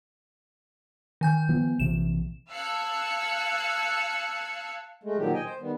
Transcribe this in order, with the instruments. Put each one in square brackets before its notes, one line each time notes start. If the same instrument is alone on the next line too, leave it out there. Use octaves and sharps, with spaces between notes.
[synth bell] D#3 G#5 G6
[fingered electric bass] F3 B3
[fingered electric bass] A#1 C3 E3 [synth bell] E7
[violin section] F5 A5 E6 F#6 G#6 C#7
[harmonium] G#3 A3
A#2 D3 D#3 F3 F#3 G4
D#5 G5 G#5
C5
D#3 G3 B3